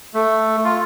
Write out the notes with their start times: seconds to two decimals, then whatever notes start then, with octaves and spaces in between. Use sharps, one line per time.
0.14 A3
0.65 F4